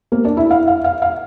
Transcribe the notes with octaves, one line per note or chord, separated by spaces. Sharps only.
A#3 A#4
D4 D5
E4 E5
F5
F5
F5
F5